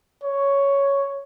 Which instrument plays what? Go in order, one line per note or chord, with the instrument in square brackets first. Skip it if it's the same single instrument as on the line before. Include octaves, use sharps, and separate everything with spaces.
[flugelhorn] C#5